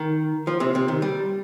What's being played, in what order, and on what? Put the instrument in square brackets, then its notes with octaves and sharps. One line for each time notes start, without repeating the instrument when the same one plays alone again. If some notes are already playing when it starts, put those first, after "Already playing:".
Already playing: [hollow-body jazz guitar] D#3
F3
C3
C3
D#3
G3